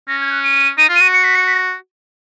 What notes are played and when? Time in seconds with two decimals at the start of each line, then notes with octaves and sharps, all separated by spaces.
0.08 C#4 A#6
0.21 G#6
0.31 F#6
0.44 D#7
0.78 D#4 D#7
0.89 F4
0.95 D#7
1.01 F#4
1.13 C#7
1.24 B6
1.35 C#7
1.47 B6
1.54 A#6